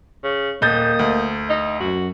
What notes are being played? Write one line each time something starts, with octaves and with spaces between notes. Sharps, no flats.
C#3
D#1 A#3 D#5 G6 A6
D2
D#4
F#2 F#4